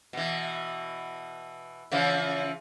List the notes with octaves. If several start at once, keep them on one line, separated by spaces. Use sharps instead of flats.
B2 E3
C#3 E3 F3